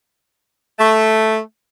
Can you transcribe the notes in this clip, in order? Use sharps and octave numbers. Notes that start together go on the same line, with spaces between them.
A3